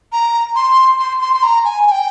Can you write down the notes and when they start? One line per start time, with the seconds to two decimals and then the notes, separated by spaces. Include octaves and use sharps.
0.12 A#5
0.56 C6
0.99 C6
1.21 C6
1.34 C6
1.43 A#5
1.65 G#5
1.87 G#5
1.91 G5